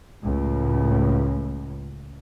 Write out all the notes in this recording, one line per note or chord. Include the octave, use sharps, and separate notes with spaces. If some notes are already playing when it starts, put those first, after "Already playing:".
C#2 A2